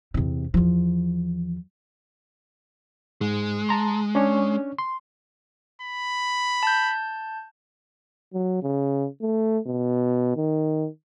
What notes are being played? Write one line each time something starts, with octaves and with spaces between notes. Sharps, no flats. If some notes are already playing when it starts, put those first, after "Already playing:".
E2 C3
E2 F3
G#2 G#3
A5 A#5 C6
C#4 D4 C#5
C6
B5
A5 G6
F#3
C#3
A3
B2
D#3